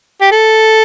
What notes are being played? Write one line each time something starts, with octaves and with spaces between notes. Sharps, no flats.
G4
A4